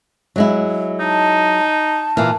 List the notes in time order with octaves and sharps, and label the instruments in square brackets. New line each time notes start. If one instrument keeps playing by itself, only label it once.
[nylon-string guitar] F#3 G#3 E4
[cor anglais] D#4 [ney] A5
[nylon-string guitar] A#2 E3 [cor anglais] F5